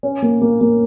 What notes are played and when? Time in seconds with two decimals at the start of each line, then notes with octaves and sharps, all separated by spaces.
0.03 C#4
0.22 A#3
0.42 A#3
0.61 A#3